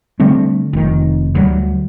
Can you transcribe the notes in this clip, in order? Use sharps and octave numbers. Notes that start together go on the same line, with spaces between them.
D3 G3 A3 C4
F1 D#3
D2 F#3 G3